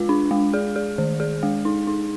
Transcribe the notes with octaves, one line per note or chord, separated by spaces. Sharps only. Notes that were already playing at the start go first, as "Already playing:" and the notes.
Already playing: G#3 F4
D4
G#3
G#4
G#4
D#3
G#4
G#3
D#4
D#4